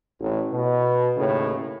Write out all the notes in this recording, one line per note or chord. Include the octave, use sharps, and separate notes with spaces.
A1
B2
D#2 A2 C#3